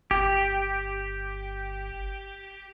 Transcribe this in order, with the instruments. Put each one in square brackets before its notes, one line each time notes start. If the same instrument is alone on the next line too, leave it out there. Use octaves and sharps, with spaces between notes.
[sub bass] G1 [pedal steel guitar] G4